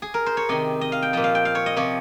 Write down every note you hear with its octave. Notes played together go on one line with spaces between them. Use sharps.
G#4
A#4
C5
C#5
C3 D#3 D#5
D#5
F5
G5
A#2 F3 D#5
F5
G5
F5
C#5
D#5
C3 F3 C#5